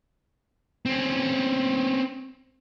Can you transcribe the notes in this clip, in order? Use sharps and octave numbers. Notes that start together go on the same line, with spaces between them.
C4 C#4